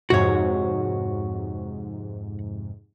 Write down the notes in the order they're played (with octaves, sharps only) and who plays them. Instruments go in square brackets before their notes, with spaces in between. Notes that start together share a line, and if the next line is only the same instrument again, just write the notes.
[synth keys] F2 G#2 C3 [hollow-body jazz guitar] F#4 C#5